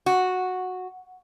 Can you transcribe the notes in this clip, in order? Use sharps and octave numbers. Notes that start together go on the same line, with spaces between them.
F#4